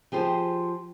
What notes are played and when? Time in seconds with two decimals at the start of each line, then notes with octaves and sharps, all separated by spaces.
0.12 F3 G4 G#4 C5